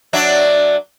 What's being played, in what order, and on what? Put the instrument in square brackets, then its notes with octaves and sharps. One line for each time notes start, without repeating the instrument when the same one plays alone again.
[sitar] F#3 D4 E5